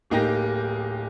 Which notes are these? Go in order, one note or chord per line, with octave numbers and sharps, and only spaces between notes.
D1 A#3 D#4 G4 A#6